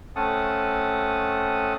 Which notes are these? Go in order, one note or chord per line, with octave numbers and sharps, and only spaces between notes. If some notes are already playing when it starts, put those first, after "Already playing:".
A3 C4 C#4 F#5 A5 D#6